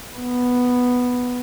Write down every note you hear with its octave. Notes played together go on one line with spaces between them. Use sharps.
B3